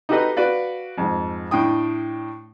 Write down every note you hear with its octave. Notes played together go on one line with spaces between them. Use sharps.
D#4 F#4 G4 A4 B4 D#5
F#4 B4 D5 F5
F2 G#2
A2 D4 G5 D#6